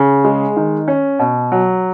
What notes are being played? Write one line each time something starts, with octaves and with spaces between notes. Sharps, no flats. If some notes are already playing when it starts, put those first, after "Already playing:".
Already playing: C#3
G#3
D#3
C#4
B2
F#3